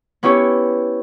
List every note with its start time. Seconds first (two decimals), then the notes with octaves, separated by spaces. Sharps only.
0.23 B3 C#4 E4 G4 C#5